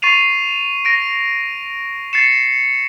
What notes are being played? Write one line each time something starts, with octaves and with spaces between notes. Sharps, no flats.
C#6 A6 C7 D#7 F7
A#6 D7
A6 C7 C#7 E7